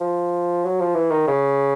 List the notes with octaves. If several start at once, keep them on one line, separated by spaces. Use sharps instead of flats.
F3
F#3
F3
E3
D#3
C#3